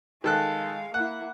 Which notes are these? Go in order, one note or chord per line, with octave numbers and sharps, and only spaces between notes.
D#3 G#3 A4 F5 F#6
A#3 E4 F#5